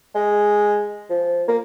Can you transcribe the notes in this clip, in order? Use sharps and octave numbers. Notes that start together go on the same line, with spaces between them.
G#3
F3
A#3